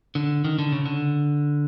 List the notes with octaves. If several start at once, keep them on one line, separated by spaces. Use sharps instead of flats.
D3
D#3
D3
C#3
D3